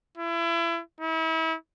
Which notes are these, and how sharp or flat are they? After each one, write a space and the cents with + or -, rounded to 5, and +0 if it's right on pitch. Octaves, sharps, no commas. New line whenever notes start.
E4 +35
E4 -35